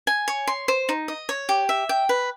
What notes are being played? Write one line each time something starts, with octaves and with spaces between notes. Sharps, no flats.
G#5
C#5
C6
C5
D#4
D#5
C#5
G4
E5
G5
B4